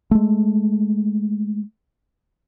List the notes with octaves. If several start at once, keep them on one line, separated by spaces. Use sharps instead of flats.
G#3 A3